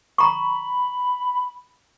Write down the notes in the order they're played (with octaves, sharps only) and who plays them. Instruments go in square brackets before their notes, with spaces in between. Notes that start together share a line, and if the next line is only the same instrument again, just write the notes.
[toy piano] A#5 C#6 [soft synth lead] B5